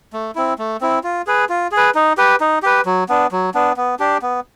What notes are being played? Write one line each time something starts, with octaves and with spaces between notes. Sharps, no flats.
A3
C4 E4
A3
C4 E4
F4
G#4 B4
F4
G#4
B4
D#4
G4 B4
D#4
G4 B4
F#3
B3 D4
F#3
B3 D4
B3
D4 G4
B3